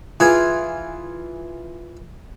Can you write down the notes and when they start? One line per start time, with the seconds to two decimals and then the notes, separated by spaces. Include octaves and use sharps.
0.20 E3 F4 G#4